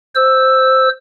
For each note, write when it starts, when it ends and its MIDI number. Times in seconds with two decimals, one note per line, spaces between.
0.15 0.89 72
0.15 0.89 88